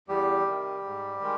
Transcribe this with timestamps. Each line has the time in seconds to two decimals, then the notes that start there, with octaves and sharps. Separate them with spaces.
0.08 E2 G3 G4
0.46 C3 D#3
0.84 G#2
1.21 D#3 G#3